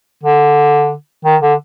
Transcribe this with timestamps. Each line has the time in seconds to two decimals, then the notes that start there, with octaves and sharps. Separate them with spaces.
0.23 D3
1.25 D#3
1.42 D3